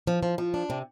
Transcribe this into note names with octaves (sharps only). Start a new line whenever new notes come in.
F3
F3
F3
D4
C3